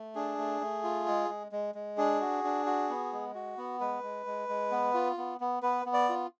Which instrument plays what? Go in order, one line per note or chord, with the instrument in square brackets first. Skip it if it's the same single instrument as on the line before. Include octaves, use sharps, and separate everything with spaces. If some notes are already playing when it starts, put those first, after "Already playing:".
Already playing: [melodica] A3
D4 G#4
A3
A3
F4
G#3
G#3
G#3
G#3
D4 G#4
F#4
D4
F#4
B3
G#3
F#4
B3
G#3 B4
G#3
G#3
G#3
B3
F4
B3
B3
B3 B4
B3
D5
F4